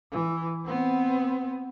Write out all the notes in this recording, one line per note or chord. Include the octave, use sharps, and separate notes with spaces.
E3
B3 C4